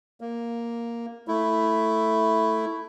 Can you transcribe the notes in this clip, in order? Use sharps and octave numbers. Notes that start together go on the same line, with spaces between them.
A#3
A3 E4